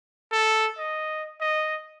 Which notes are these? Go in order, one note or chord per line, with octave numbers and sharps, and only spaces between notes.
A4
D#5
D#5